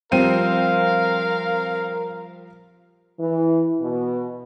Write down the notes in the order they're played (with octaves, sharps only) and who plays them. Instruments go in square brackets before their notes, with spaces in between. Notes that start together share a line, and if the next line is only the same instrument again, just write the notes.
[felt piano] F3 G3 D#7 [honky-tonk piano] C4 [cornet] A#4 [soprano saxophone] F5
[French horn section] E3
B2